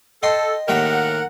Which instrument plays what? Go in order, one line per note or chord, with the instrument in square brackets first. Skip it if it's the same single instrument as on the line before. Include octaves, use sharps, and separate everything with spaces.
[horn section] A4 [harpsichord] D#5 G5 C6
[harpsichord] D#2 A2 G5 [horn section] A#4 F#5